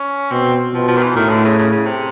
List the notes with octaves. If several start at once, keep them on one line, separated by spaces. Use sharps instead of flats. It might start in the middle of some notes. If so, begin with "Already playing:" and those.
Already playing: C#4
B2 C4
B2 F3
F3
D#3
E3
A2 D#3
D3
C#3
C#3
C#3
C3